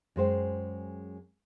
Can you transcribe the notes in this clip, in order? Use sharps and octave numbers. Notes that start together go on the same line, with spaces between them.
F#2 G#3 C5 G5